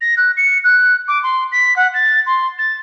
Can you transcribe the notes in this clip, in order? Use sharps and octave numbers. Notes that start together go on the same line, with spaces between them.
A#6
F#6
C#7
F#6
D6
C6
B6
F#5
A6
C6
A6